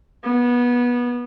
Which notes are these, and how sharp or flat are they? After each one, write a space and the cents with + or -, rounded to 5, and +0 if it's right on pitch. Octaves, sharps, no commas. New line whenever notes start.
B3 -20